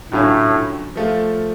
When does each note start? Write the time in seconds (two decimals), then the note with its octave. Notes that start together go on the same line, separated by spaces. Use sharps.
0.12 A2 D3 F#3 C#4 F4
0.96 F3 A3 F4